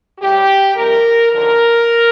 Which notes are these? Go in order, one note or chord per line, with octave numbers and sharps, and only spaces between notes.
A2 G3 G4
F2 C3 G3 A#4
D#2 D3 F3 A#4